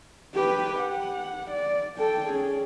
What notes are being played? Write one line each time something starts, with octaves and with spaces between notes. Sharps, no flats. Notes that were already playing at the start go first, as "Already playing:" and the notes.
G4 B4
F#5
D5
A4 G5
C#4 G#4